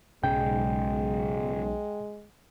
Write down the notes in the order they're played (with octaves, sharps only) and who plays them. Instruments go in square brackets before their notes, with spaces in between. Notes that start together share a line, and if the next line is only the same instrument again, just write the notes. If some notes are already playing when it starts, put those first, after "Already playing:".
[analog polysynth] B1 [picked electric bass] G#2 C#3 [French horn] G#3 [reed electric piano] G5